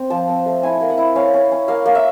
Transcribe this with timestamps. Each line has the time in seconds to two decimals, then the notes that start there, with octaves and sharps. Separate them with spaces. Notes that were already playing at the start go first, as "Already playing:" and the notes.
Already playing: C4
0.10 F3 A5
0.28 C4
0.46 A3
0.63 E4 G#5
0.81 A#3
0.90 F#5
0.98 E4
1.16 C#4 F5
1.34 C#4
1.52 C#4
1.68 A#3 F5
1.86 A#3
1.95 E5